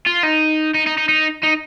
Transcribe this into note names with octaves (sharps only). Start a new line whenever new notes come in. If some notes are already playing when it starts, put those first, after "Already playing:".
F4
D#4
D#4
D#4
D#4
D#4
D#4